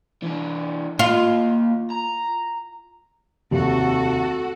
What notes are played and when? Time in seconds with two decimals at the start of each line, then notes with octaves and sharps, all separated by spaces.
0.22 E3 D4
0.99 A#3 F4 D#5
1.91 A#5
3.51 F1 D#2 F#4 A4